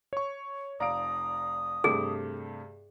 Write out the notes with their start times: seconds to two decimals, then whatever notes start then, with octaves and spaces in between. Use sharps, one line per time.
0.13 C#5 C#6
0.80 F1 D5 F5 A#5 D#6 D7
1.84 G2 C3 A3 G#4